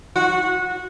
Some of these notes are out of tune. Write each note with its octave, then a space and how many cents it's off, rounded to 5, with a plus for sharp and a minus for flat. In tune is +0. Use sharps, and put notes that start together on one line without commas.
F#4 -20